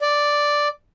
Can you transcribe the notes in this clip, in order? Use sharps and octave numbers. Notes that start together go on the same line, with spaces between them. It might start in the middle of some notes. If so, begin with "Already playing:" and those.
D5